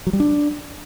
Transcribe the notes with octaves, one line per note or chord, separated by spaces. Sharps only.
F#3
G3
D4